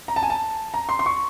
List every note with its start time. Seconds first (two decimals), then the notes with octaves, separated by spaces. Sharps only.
0.08 A#5
0.16 A5
0.23 G#5
0.30 A5
0.74 A#5
0.89 C6
0.99 C6
1.06 C#6